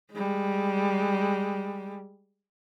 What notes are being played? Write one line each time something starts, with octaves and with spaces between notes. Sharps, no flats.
G3 G#3